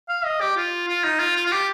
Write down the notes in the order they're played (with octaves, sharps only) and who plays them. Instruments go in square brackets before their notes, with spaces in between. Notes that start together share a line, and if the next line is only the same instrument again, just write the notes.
[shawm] F5
D#5
G4
F4
F4
D#4
F4
F4
F4
G4